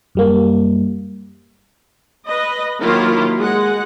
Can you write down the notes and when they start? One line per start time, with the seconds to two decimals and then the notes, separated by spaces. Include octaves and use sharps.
0.15 F#2 G3 A#3
2.26 B4 D#5
2.80 D#3 F#3 A#3 E4 F4 G4
3.38 G#3 F#5